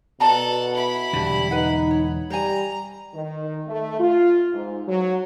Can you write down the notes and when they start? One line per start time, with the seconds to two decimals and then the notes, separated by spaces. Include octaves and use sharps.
0.20 B2 A4 D5 F#5 A5 A#5
0.74 E4 B5
1.13 E1 D3 G3 D4
1.51 D#4 B4 F#5
1.91 C#5
2.30 G3 C5 G#5 A#5
3.14 D#3
3.67 A3
4.00 F4
4.53 G#2
4.87 F#3